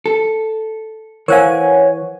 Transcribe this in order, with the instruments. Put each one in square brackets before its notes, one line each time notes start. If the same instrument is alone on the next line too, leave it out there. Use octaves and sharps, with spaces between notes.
[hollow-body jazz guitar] A4
[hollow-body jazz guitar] E3 [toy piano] A#4 C5 F5 [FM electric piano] C#5 F#5 G#5